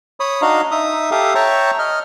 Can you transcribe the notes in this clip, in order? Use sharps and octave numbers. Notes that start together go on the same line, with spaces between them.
C#5 B5 D#6
D4 D#4 F#4 D#5 F5 A#5
D#4 E5 D#6
G4 A4 E5 F5 D#6
C#5 E5 G5 A5 A#5 C#6
D#5 F6